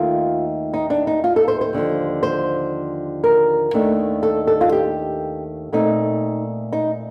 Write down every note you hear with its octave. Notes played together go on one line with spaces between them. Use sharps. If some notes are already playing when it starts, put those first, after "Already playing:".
Already playing: D#2 D#3 A3 F4
D#4
D4
D#4
F4
A4
C5
C5
D#2 D3 F3
C5
A#4
D#2 D#3 A3 D4
A4
A4
F4
G4
A#2 A3 C4 D#4
D#4